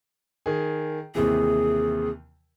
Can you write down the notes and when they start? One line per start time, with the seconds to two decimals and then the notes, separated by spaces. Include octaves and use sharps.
0.46 D#3 G#4
1.15 D#2 C3 E3 G#4